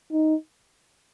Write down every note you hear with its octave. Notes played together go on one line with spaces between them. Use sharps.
D#4